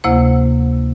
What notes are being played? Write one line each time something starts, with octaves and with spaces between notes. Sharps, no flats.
D2 C3 A#3 E4 C5